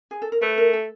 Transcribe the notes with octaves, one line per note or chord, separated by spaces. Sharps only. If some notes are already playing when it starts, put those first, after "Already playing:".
G#4
A4
A#4
A3 B4
A#4
A4